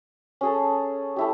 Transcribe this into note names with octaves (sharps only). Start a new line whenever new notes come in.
C#4 G#4 A4
A3 E4 G4